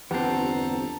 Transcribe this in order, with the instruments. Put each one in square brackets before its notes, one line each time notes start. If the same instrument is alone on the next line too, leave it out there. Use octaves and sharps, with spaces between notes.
[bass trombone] G1 [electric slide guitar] E2 C4 [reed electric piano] G4 B4 F#5 [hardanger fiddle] A4 A#5